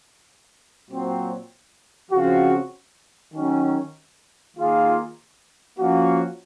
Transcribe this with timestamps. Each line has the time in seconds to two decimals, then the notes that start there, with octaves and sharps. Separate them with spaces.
0.89 A#2 F#3 C4
2.11 C#3 F3 C4 F#4
3.33 D#3 F#3 C#4
4.56 D#3 A#3 F4 G#4
5.79 F3 A#3 C#4 F#4